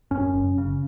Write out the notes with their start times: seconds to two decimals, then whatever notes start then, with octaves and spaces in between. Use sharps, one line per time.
0.11 F#2 C#4
0.34 F#1
0.58 C#3